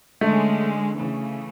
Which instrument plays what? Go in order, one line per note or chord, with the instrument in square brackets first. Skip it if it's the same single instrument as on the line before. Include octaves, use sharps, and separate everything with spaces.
[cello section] D3 G#3 C#4 [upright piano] A3
[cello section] C#3 E3 A3